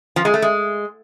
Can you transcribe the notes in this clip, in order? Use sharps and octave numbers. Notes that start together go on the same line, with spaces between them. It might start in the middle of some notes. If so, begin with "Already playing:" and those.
F3
G#3
A3
G#3